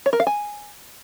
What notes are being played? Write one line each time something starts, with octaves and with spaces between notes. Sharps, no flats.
C#5
A#4
F5
G#5